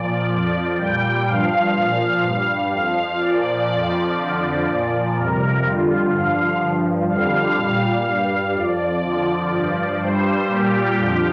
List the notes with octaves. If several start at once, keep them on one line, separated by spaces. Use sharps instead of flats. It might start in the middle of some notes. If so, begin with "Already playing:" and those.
Already playing: A#2 F3 D5
F2 F3
A#2 G3 G5
G2 F3 F5
A#2 F3
G2 G3
F2 F3 F5
A#2 F3 D5
F2 F3
F2 D3 F3
A#2 F3
F2 C3 G3 A#4
F2 D3 G3 F4
G2 D3 F3 F5
G2 F3
F2 D3 G3 F5
A#2 G3
G2 G3
F2 F3 D5
F2 D3 F3
G2 F3
G2 G3 C5
A#2 G3 G4
F2 D3 F3 G4